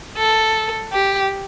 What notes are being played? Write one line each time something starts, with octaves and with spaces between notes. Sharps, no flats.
A4
G4